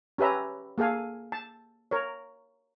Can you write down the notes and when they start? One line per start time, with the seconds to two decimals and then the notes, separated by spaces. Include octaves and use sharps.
0.18 C#4 G4 B4 E5 A#5
0.78 A#3 G#4 A4 F5 G#5
1.32 A5
1.91 A#4 C#5